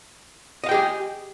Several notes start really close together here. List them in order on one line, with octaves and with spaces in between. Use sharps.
D#5 F5 G5 G#4 G4